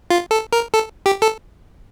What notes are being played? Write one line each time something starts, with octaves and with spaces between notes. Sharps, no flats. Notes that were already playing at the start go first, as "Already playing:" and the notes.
F4
A4
A#4
A4
G4
A4